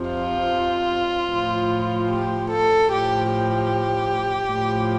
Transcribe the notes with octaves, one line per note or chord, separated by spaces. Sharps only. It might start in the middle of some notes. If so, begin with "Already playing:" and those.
Already playing: F2 C3 F3
F4
A2 F3
G4
A4
A2 F3 G4
G4
A2 F3